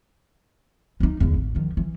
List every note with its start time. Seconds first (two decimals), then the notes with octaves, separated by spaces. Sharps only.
1.00 D2 D#4
1.20 E2 D3
1.33 A1
1.55 D#3 F3
1.77 E3